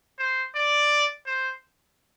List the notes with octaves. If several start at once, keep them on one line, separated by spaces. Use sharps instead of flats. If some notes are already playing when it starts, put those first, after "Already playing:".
C5
D5
C5